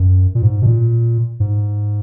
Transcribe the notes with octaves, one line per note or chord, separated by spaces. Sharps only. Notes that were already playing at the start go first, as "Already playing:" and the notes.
Already playing: F#2
A#2
G#2
B2
A#2
G#2